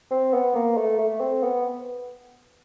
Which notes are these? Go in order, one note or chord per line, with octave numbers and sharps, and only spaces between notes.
C4
B3
A#3
A3
A3
C4
B3